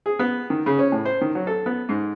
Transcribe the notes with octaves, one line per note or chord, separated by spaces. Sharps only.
G#4
B3
D#3
C#3
C#4
A2
C5
D#3
F#3
A4
B3
G#2